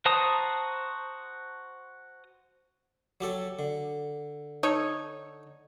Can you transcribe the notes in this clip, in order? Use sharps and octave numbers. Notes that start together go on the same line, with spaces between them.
F#4 C5 A5 A#5 D#6
F#3 G4 A4
D3
D#4 A4 C#5